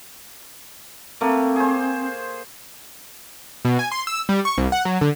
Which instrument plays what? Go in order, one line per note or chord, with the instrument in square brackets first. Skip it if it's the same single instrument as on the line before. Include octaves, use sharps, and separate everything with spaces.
[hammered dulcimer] A3 A#3 [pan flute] C4
[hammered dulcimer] G#4 C5
[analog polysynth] B2
G#5
C6
E6
G3
C#6
C2
F#5
F#3
D3